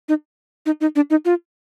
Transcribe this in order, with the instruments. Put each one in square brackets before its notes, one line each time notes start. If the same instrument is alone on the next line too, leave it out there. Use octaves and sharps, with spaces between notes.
[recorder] D#4
D#4
D#4
D4
D#4
F4